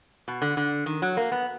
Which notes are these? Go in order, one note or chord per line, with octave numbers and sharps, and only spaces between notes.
B2
D3
D3
D#3
F#3
A#3
B3